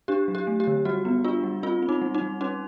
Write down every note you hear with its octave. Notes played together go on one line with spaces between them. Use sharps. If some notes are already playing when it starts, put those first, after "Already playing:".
D4 G4
F#3
G4
A3
G4
D3
G3 F#4
B3
D4 F4
G3
C4 F4
C4
D#4
G3
D#4
G3
C#4 D#4